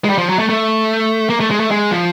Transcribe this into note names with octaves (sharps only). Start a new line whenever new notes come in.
G#3
G3
F3
F#3
A3
A3
A#3
A3
G#3
A3
G#3
F3